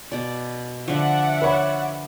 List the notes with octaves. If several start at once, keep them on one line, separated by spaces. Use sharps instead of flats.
B2 D5
D3 F3 D5 E5 F#5
B4 C#5 B5